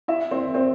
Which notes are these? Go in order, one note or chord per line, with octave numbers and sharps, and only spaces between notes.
E4 E5
C4 C5
C4 C5